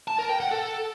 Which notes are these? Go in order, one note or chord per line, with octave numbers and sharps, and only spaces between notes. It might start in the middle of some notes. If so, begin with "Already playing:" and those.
A5
A#4
G5
F#5
A4